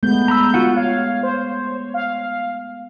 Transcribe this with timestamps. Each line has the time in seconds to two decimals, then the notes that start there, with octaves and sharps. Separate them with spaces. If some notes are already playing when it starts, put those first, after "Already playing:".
0.03 G#3 A3 B3 G6
0.28 A#5 B5 E6
0.54 F4 F#4 F#5
0.77 C#5 F5
1.23 C5
1.94 F5